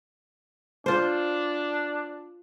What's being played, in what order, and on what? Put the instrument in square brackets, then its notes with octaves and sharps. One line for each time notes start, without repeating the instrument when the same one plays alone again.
[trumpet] D4 [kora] F4 C5